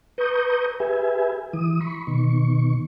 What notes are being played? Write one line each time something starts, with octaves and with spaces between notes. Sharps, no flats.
B4 A#5 C#6 D#6 G6
G4 G#4 B4 E5 G#5
E3 D#6
B5 C#6
B2 D#3 C#6